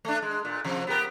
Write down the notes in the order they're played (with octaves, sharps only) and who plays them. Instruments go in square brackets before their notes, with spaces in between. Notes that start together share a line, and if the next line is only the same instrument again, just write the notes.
[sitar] A3 D4
G#3
A#2
C3 F3
B3 G4 A#4